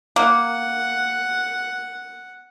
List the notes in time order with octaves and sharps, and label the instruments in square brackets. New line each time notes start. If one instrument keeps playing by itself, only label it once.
[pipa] A#3 [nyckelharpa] F#5